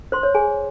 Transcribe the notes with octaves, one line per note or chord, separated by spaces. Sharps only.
C5 C6
C#5
G#4 G#5